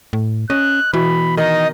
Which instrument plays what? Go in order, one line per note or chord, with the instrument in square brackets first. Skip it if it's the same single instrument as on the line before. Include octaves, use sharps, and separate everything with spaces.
[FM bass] A2
[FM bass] C#4 [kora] D#5 [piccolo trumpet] F#6
[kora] B2 [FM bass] E3 [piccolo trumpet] B5
[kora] D#3 [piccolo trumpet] D#4 [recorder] D#5